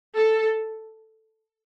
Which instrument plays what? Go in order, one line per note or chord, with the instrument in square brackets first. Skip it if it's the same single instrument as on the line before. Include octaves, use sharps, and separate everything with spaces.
[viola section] A4